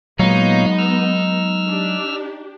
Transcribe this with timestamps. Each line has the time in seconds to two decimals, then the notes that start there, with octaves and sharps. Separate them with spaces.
0.19 A#2 F#3 G#3 B3 D#4 C#5 F5
0.79 E6 F6
1.68 D4 G4